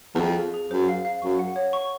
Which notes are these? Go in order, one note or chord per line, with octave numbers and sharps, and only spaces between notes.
E2
F2 G#4
F5
G#4
F#2 C5
F5
F5
F#2 C#6
F#5
C#5
C#6